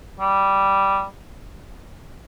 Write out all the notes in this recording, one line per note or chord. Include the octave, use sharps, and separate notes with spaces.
G3